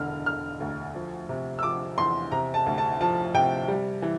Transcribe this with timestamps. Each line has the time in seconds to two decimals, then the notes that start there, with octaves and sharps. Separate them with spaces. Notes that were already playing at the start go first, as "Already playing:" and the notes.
Already playing: E1 D3 F6
0.26 D3 F6
0.60 D2
0.95 F3
1.29 C3
1.59 E6
1.63 F3 D6
1.98 E2 C6
2.31 C3 A#5
2.54 A5
2.66 D2
2.78 A5
3.01 F3 A5
3.34 C3 G5
3.68 G3
4.02 E3